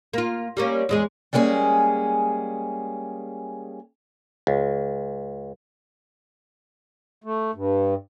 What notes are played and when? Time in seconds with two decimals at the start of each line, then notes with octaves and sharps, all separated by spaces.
0.13 A#3 F4
0.57 G3 A#3 C#4
0.89 E2 G#3 G#4
1.33 G3 G#3 A#3 C#4 G#4
4.47 C#2
7.24 A3
7.55 G2